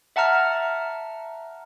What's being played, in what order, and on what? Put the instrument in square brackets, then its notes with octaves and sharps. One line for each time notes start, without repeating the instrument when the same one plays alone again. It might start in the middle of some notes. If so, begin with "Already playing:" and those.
[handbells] E5 F#5 A5 A#5 F6